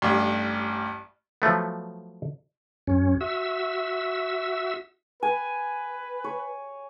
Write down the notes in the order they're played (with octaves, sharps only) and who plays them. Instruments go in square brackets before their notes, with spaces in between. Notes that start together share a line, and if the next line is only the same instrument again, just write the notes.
[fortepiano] A1 G2
[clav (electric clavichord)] F3 F#3 A3 B3
[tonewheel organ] F#2 C#4
F#4 E5 E6
[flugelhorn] B4 [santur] G#5
[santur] C#5